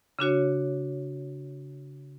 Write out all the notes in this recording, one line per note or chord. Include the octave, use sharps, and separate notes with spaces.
C#3 D4 F#4 C#5